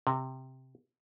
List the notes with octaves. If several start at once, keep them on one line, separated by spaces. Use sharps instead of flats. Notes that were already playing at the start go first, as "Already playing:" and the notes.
C3